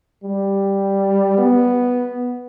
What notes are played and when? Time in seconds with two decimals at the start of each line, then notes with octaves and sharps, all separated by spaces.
0.24 G3
1.38 B3